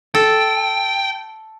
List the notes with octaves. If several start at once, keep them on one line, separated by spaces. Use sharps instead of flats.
A4 G5